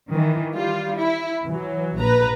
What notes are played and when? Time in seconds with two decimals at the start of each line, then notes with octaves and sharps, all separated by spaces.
0.11 D#3 E3
0.54 G3 F4
0.99 E4
1.46 E3 F#3
1.99 A#1 B4 A#5